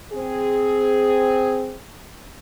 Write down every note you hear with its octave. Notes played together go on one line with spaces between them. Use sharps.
C4 G#4